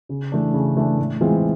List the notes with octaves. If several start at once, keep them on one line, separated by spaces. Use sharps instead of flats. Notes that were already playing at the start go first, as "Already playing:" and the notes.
C#3
E3 A3 D4
C#3
E3 A3 D4
A2
E3 G#3 C4 F4